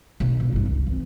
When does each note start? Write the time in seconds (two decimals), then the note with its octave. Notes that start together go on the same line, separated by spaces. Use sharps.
0.20 B1
0.38 G#2 B2
0.52 G1 D#4
0.66 C#2
0.87 E3 C4